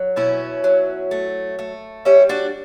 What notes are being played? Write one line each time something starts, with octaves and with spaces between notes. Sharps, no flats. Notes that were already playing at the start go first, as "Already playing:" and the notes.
Already playing: F#3
B2 C#4 E4
F#3
A3
A3
G3 C#4 E4
D4 F#4